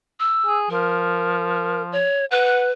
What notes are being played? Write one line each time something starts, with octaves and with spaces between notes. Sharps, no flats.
E6
G#4
F3 A#4
C#5
B4 F#5